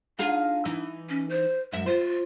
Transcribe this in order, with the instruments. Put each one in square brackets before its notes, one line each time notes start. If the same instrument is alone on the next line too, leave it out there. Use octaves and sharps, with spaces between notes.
[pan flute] D4 [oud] D#4 F4 G#4
[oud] E3 D#4
[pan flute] C#4
C5
[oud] F#2 E5 [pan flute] G#3
[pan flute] F4 [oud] C5